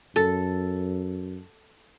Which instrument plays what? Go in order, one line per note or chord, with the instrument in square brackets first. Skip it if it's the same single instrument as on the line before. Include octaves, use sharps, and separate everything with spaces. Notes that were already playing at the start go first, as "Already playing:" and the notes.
[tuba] F#2 [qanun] A4